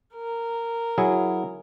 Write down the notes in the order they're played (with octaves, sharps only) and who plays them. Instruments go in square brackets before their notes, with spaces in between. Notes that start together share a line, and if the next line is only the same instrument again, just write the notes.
[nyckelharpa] A#4
[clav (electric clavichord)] F#3 E4 G#4